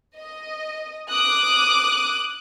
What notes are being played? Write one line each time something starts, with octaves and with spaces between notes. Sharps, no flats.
D#5
D6 D#6 F#6